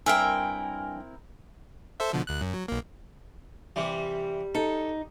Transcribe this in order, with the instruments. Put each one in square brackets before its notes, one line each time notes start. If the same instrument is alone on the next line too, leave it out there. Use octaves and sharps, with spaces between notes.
[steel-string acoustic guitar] G2 G5 [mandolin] C4 E4 A#4 [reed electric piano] G#5
[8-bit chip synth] A4 C5 E5
B2 D3 F3
D2 F#6
F#2
F#3
B1 A#3
[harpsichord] C3 E3 [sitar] G3
[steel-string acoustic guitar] D#4 [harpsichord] A4